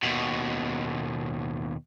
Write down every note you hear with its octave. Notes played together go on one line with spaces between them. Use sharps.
D#2 B2